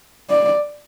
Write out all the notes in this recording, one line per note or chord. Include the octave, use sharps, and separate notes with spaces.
D5